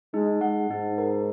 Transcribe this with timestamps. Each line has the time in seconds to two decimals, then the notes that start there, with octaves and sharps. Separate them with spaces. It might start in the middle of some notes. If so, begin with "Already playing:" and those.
0.14 G#3 D#4
0.41 G#3 F#5
0.69 G#2 D#4
0.98 A#4